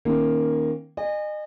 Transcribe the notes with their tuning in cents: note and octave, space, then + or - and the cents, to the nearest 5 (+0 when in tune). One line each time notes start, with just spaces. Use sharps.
D#3 +0 A#3 +0 C#4 -35
D#5 -35 G#5 -20